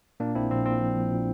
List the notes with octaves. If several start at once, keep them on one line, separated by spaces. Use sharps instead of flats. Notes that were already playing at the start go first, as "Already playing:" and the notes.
A#2 A#3 D4
A#1 C4 E4
A#1 C4
A#2 C4
F3
A#1
A#2